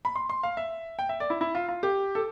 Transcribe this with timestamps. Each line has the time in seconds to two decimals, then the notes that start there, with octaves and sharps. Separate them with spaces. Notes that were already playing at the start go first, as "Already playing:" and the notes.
0.05 B5
0.16 C6
0.30 C6
0.43 F5
0.57 E5
0.99 G5
1.09 E5
1.20 D5
1.30 E4
1.41 E4
1.55 F4
1.68 F4
1.83 G4
2.15 A4